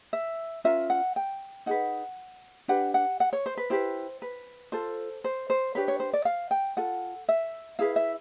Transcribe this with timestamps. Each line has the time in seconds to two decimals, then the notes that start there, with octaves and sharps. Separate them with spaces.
0.13 E5
0.64 C#4 F4 A#4 E5
0.90 F#5
1.16 G5
1.66 D#4 G#4 B4 F#5
2.68 D4 G4 B4 F#5
2.94 F#5
3.20 F#5
3.33 C#5
3.46 C5
3.57 B4
3.70 E4 G4 B4 C5
4.22 B4
4.72 F4 A4 C5
5.24 C5
5.50 C5
5.75 D4 G4 B4 C#5
5.88 C#5
6.00 C5
6.13 D5
6.25 F5
6.51 G5
6.77 F4 A4 F#5
7.29 E5
7.79 E4 G#4 B4 F5
7.96 E5